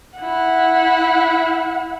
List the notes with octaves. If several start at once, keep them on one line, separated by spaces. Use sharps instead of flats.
E4 F#5